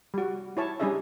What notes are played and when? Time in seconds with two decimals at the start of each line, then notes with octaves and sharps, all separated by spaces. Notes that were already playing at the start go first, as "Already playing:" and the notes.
0.14 G3 F#4
0.57 E4 C#5 A5
0.80 G3 C#4 D4 G#4 D#5 E5